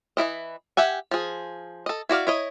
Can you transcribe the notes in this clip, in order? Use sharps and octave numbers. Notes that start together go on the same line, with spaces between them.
E3 A#3 E4 D#5
G4 E5 F#5 G#5
F3 G#4
A4 D#5
E4 F#4 D5 F5
E4 C#5 D#5